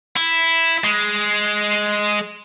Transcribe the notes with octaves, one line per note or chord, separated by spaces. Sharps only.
E4
G#3